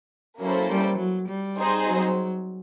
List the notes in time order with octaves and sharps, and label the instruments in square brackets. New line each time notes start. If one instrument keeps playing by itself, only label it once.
[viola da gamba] F#3 [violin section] A#3 C#4 E4 A4 C5
[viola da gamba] G3
F#3
G3
[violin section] C4 D#4 G#4 C5
[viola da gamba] F#3